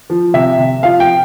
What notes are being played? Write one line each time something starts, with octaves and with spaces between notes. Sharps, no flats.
F3
C3 E5
C3
F3 F5
G5